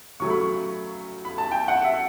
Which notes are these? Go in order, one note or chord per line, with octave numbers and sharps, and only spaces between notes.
C#3 F#3 A3 C#6
B5
C#6
B5
A5
G5
F#5
E5